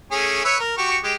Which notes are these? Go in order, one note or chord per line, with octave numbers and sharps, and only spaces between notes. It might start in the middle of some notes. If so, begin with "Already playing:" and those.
A3 C#4 G#4
B4 C#5 E5
A#4
F#4 G4 C#6
G#3 G4